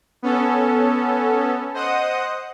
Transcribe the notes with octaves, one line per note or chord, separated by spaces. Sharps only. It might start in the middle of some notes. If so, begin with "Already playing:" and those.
B3 C#4 A4
C5 D#5 F#5 D#6